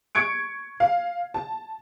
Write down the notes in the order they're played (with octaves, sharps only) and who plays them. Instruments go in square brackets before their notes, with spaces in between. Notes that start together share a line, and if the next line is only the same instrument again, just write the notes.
[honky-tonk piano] C#6 G#6 C#7 D7
F5
A5